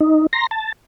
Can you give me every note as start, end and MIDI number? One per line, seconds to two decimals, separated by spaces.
0.01 0.27 63
0.33 0.47 82
0.33 0.47 84
0.33 0.47 94
0.51 0.72 81